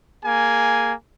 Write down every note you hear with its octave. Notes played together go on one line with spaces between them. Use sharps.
A#3 G#4 G#5